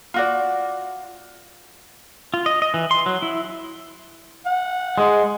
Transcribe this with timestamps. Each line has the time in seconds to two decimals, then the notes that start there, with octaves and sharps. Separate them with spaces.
0.14 F4 F#4 D5
2.34 F4
2.46 D#5
2.62 D#5
2.74 E3
2.91 C6
3.06 F#3
3.22 E4
4.46 F#5
4.98 G#3